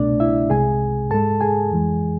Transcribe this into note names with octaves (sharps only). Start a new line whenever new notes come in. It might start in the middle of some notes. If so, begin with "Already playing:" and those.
Already playing: C2 B2 A3 D4 D5
E4 E5
C2 C3 G#3 G#4 G#5
G#2 G#3 A4 A5
G#4 G#5
F2 E3 G#3